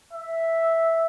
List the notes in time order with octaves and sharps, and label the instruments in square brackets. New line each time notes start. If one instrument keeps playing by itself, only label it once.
[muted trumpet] E5